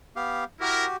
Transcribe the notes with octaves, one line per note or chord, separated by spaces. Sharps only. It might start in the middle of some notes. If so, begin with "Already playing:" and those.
B3 G4 F5
E4 F#4 G4 A#4